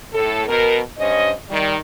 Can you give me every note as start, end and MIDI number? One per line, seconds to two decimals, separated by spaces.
0.13 0.45 45
0.13 0.45 69
0.48 0.79 47
0.48 0.79 70
0.99 1.31 43
0.99 1.31 61
0.99 1.31 72
0.99 1.31 75
1.49 1.74 51
1.49 1.74 55